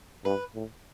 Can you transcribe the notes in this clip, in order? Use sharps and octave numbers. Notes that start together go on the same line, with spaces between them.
G2 B4
A2